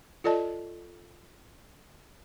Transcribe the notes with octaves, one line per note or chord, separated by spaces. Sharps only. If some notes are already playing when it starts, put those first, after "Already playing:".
F4 A4 D5 D#5 A5